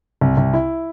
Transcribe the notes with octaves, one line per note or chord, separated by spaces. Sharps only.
C2
C2
E4